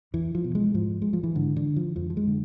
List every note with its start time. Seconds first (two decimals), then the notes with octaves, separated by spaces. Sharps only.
0.13 E2 E3
0.35 F3
0.44 B2
0.55 G#3
0.74 G#2 F3
1.02 G#3
1.13 F3
1.23 E3
1.35 G#2 D3
1.56 D3
1.76 F3
1.96 F2 F3
2.10 F3
2.17 G#3
2.27 D3